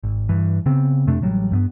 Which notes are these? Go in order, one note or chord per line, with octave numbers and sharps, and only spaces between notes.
G#1
G2 E3
C#3 B3 C4
F2 C3 A3 D4
A1 F#3 G3
G2 A3 B3